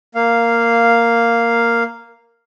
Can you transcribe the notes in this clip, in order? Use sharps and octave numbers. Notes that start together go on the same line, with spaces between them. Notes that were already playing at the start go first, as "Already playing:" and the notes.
A#3 F5